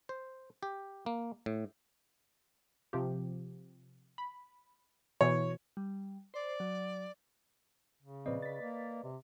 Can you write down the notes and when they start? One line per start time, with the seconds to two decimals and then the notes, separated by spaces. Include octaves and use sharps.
0.09 C5
0.63 G4
1.06 A#3
1.46 A2
2.93 C3 F3 G4
4.18 B5
5.21 B2 E3 C#5
5.77 G3
6.34 C5 D5
6.60 F#3
8.03 C#3
8.26 A#2 F3 C4 B4 D5 D#5
8.42 A6 B6
8.61 A#3
9.03 C3